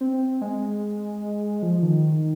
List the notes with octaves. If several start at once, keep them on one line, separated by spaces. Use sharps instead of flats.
C4
G#3
F3
D#3